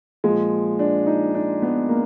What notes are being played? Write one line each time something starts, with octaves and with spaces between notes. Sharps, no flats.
A#2 F3 G#3
D4
D#4
D4
B3
A#3